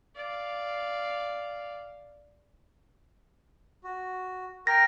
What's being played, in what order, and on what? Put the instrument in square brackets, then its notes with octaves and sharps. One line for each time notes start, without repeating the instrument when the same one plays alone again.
[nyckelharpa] D5 F5
[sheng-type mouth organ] F#4
[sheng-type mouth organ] A#4 G5 [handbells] A#6